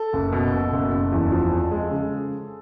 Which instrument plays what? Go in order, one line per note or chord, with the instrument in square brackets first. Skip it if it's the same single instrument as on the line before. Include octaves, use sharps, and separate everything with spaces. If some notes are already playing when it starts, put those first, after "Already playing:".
Already playing: [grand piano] A4
F#1
B2
B2
F#1
F#1
E2
F3
F2
G#3
C#3